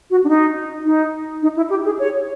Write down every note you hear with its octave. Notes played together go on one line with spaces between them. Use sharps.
F#4
D4
D#4
D#4
D#4
E4
G4
G#4
C#5